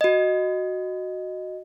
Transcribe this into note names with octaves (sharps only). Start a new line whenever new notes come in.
F#4 D#5